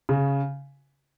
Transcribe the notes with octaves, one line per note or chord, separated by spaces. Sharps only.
C#3